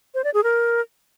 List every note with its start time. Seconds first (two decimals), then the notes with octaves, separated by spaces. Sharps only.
0.15 C5
0.24 D5
0.34 G#4
0.44 A#4